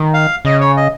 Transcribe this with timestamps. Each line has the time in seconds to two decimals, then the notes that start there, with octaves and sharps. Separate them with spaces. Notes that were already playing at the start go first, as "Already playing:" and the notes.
Already playing: D#3
0.14 F5
0.45 C#3 D#5
0.61 C#5
0.77 D#5